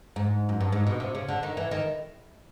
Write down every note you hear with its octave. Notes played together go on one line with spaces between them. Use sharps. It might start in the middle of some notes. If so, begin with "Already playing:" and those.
G#2
F#2
G2
G#2
B2
C3
C#3
D3
D#3
E3
D#3